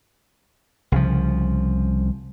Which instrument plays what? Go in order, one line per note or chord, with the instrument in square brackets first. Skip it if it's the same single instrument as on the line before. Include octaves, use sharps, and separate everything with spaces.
[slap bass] C2 C#3 F3